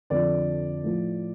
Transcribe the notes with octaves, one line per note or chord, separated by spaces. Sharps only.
F2 D3 F3 D5
A2 F3